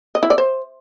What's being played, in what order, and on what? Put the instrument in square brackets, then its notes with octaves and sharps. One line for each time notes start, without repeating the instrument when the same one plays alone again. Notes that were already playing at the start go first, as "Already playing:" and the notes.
[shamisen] D#5
E4
D5
C5